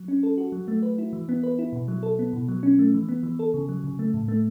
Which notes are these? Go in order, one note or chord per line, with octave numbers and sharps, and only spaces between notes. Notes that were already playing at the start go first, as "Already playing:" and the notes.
Already playing: F#3
C#4
A4
F#4
F#3
A3
B4
E4
E3
B3
B4
E4
B2
F#3
A4
B3
B2
F#3
C#4
A3
E3
B3
E3
A4
C#3
F#3
C#3
A3
A2
A3